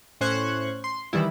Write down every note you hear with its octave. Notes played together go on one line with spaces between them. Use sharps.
A2 C#4 C5 C#6 F#6 G#6
C6
D#3 E3 G3 E4